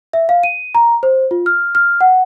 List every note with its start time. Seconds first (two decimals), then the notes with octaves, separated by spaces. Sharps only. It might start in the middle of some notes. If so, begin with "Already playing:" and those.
0.13 E5
0.29 F5
0.43 D#7
0.75 A#5
1.03 C5
1.31 F4
1.46 F6
1.75 F6
2.01 F#5